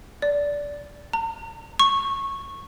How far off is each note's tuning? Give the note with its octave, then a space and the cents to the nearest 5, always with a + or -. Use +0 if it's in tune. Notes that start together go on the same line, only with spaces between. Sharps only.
D5 -15
A#5 -40
C#6 -15